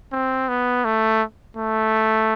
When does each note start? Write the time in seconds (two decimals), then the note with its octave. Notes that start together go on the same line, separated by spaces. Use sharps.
0.12 C4
0.49 B3
0.85 A3
1.57 A3